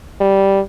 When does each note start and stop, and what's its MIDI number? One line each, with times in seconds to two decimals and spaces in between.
0.21 0.60 55